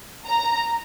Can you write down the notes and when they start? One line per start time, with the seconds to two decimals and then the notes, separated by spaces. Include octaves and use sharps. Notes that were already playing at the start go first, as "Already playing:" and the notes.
0.27 A#5